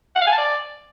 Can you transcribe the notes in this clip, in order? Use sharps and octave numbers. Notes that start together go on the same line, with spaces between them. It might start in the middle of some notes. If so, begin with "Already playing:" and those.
F#5
F5
G#5
A5
D5